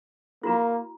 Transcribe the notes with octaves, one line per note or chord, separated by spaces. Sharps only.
A#3 E4 F#4 A#5